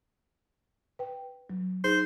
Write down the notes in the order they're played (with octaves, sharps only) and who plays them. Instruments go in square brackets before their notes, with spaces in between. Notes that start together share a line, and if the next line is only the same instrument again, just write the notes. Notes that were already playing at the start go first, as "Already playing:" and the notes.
[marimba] B4 G5
F#3
[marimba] D#4 G#4 [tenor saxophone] C5